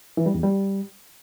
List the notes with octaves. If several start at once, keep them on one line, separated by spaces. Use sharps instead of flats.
E3
G3
E2
G3